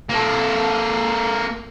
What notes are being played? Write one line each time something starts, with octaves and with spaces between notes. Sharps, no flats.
A#3 A4